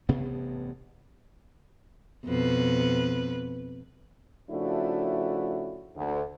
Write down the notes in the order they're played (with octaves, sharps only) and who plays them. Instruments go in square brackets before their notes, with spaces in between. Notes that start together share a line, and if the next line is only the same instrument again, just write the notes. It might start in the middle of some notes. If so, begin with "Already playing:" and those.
[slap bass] A1 G2 C3 B3
[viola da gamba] F2 B2 B4
[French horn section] C#3 F3 A3 D4 E4 F#4
D2